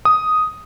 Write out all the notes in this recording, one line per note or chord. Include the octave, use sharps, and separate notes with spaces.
D#6